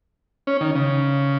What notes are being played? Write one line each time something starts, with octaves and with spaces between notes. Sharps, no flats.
C#4
D#3
C#3